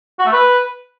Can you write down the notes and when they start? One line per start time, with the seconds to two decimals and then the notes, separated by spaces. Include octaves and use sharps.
0.19 F#4
0.26 A3
0.32 B4